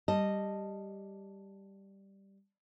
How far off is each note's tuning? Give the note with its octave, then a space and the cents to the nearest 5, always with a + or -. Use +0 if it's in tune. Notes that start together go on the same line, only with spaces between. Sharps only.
G3 +0 D#5 -5 A5 +0